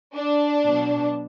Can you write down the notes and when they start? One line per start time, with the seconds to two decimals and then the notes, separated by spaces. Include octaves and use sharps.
0.16 D4
0.65 B2 F#3